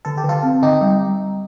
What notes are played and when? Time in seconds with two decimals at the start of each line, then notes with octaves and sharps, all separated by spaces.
0.05 D3 A4
0.18 G4
0.24 D3 F4 A4
0.43 C4
0.62 D3 D#4 G4
0.81 G3